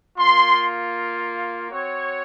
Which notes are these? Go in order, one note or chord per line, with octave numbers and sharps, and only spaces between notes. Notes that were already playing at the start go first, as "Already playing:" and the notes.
A#3 F4 C6
C4 F#4 C#5